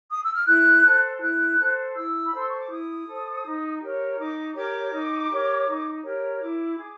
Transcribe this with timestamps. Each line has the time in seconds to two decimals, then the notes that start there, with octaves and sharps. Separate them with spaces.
0.12 D#6
0.23 E6
0.35 F6
0.47 E4 F#6
0.84 A4 C5
1.21 E4 F#6
1.59 A4 C5
1.96 E4 E6
2.25 B5
2.33 A4 C5 C6
2.48 C#6
2.59 D6
2.70 E4 D#6
3.07 A4 C5
3.45 D#4
3.81 G4 A#4 C#5
4.18 D#4 D6
4.55 G4 A#4 C#5 D6
4.93 D#4
5.30 G4 A#4 C#5
5.67 D#4
6.04 G4 A#4 C#5
6.40 E4 D6
6.78 G#4